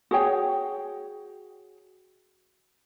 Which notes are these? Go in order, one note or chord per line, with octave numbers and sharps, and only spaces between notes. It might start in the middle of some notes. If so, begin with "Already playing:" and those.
F#4 G#4 C#5 G5